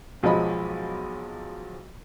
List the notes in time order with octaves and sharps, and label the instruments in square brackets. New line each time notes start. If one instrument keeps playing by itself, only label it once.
[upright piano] B1 F3 F#3 G#3 D#5 B5